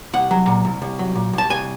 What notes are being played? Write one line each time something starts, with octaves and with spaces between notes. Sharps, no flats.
C2 F#5
F#3
A#2
C2
C2
F#3
A#2
C2 A5
C2 G#5